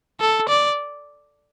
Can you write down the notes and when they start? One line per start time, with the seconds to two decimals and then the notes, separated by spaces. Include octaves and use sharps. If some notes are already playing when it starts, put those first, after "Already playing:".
0.20 A4
0.49 D5